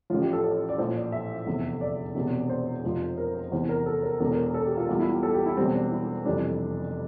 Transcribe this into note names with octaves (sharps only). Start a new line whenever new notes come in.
A1 A2 F3 F4
G4
A4
A4
D5
A#1 A2 F3 C5
D5
E5
F1 E2 D3
D5
E1 E2 C3
C5
F1 F2 C3 F3
A#4
C5
E2 C3 E3 C5
A#4
A4
A#4
E1 E2 E3 A4
A#4
A4
G4
F4
E2 E3 G3 F4
E4
G4
A4
G4
E4
E1 E2 E3 G3 C4
D4
E4
F1 F2 E3 G3 D4